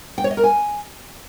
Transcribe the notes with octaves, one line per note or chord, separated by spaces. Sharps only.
G5
C#5
D#5
A#4
G#5